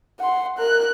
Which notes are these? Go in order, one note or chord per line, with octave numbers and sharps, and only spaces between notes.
F#5 C6
A#4 F#6